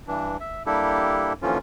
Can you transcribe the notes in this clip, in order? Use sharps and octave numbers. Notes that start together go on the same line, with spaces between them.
G2 E3 D4
E5
G3 A#3 D4 E4 G4 A4
D#2 D3 E3 F3 C#4 F4